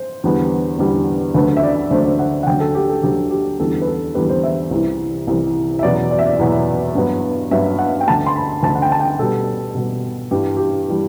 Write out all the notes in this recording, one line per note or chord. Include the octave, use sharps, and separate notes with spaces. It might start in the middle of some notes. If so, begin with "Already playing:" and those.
Already playing: C5
E2 D3 G3 B3
E2 D3 G3 B3
D2 D3 F#3 A3 B4
E5
D5
D2 D3 F#3 A3 C5
D5
F#5
F#5
D2 D3 F#3 G5
A4
G4
A4
D2 D3 F#3 G4
G4
E2 D3 G3 B3 A4
B4
A4
E2 D3 G3 B3 B4
C5
E5
C2 C3 E3
C2 C3 E3
E5
E2 B2 F#3 B3 D5
D5
E5
D5
E2 B2 F#3 B3
G2 F#3 B3
G2 F#3 B3 E5
F#5
G5
D2 D3 A3 A5
C6
B5
D2 D3 A3 A5
F#5
G5
A5
G5
B2 G3 B3 A4
B2 G3 B3
G2 E3 G3 G4
G4
E3 G3